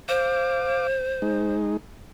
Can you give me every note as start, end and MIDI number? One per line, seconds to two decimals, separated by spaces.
0.09 1.55 72
0.09 0.87 77
0.09 0.87 86
1.22 1.77 56
1.22 1.77 63